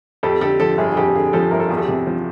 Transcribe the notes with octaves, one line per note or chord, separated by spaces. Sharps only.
F2 G4 A4
D3 G4 A4
F3 G4 A4
G1 G#4
G#4
F2 G4 A4
D3 G#4
F3 G4 A4
G1 A#4
A4
E2 G#4
G4 A4
C3
F3